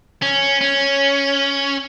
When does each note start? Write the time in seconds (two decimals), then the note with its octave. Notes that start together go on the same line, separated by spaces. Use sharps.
0.22 C#4
0.61 C#4